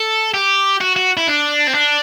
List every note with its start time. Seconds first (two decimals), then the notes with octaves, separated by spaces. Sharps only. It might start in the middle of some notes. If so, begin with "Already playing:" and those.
Already playing: A4
0.34 G4
0.81 F#4
0.96 F#4
1.17 E4
1.27 D4
1.67 C4
1.74 D4